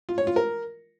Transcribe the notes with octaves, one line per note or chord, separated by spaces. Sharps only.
F4
C#5
F4
A#4